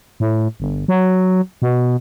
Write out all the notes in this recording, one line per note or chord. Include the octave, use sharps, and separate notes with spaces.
A2
G1
F#3
B2